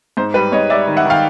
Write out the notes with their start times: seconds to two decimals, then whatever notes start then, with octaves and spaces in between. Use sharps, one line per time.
0.17 G#2 C5
0.34 G3 B4
0.52 G#2 C#5 D#5
0.70 G3 D5 E5
0.87 D#3
0.97 E5 F#5
1.05 D#3
1.10 F5 G5